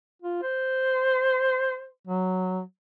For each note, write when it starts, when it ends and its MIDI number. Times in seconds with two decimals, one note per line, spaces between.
0.22 0.38 65
0.43 1.87 72
2.07 2.61 54